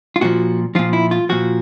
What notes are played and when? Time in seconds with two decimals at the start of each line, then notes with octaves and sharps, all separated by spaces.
0.16 F4
0.21 A#2 F3 F#4
0.75 A#2 F3 F4
0.93 E4
1.11 F4
1.29 A#2 F3 F#4